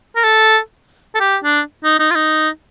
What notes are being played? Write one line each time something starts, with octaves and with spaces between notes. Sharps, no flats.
A#4
A4
A4
G4
D4
D#4
D#4
F4
D#4